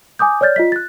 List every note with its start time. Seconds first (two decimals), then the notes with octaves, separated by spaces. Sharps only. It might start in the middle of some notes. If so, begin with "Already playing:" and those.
0.19 G#5 D6 D#6 G6
0.41 C#5 D5 F6 G6 A6
0.56 F4 D#5 B6
0.72 F#6 A6